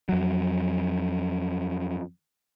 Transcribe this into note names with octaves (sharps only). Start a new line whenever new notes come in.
F2 F#3